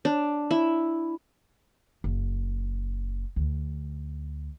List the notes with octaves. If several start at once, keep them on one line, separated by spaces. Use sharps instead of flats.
D4
E4
F#1
D2